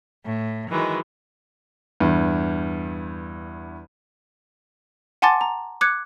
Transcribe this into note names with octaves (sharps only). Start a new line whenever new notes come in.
A2
D#3 E3 F#3 G#3
E2 G2
F#5 G#5 A5 C6 D6 A6
A#5
D6 F#6 G#6 C#7